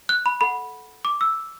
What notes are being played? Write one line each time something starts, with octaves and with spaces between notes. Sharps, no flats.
F#6
B5
A4 F#5 B5
D6
E6